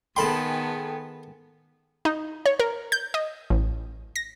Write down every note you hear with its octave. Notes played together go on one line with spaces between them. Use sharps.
D#3 B3 G#4 A4 G5 A5 B5 C6
D#4
C#5
A#4
G6
D#5
A1
A#6